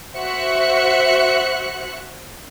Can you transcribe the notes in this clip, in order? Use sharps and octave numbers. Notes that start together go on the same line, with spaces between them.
F#4 C5 E5 F#6 C#7